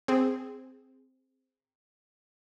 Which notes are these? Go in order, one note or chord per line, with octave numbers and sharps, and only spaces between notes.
C4 G#4